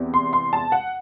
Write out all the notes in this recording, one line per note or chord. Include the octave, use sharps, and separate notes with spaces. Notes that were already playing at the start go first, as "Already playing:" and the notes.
Already playing: E2 C3
C6
C6
A5
F#5